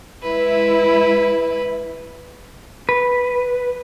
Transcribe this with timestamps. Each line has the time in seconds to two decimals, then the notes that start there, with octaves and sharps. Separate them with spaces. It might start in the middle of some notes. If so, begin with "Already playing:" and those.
0.23 G#3 E4 B4
2.89 B4